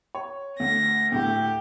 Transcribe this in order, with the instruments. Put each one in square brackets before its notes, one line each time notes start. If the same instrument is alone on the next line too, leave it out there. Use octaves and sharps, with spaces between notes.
[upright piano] C#5
[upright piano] D2 [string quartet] A#6
[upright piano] D2 A2 A3 [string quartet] G4